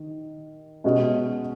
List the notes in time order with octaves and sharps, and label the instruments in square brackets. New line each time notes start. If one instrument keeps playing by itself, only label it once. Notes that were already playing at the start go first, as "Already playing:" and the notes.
Already playing: [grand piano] D#3
B2 G#3 C#4 F#4 D#5